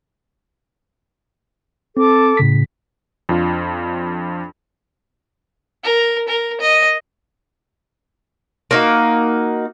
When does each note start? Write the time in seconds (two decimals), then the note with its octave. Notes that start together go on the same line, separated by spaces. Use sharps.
1.97 C4 A4 D6
2.37 A2 C#3 B6
3.29 F2 D4 F4
5.83 A#4
6.28 A#4
6.61 D#5
8.71 A#3 D#4 F#4